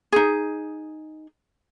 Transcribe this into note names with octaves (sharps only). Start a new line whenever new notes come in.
D#4 G#4